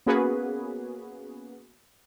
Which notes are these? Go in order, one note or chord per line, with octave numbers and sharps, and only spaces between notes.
A#3 B3 C#4 F#4 G#4 B4